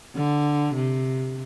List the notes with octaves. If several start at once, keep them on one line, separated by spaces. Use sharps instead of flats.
D3
C3